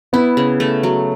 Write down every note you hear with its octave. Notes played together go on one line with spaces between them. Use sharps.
B3 E4
C#3
A3
F#3